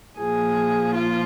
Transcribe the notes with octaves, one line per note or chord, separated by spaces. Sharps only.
A#2 F3 G#4
F4